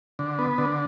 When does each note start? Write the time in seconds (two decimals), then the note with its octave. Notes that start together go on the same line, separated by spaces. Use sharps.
0.19 D3
0.39 B3
0.58 D3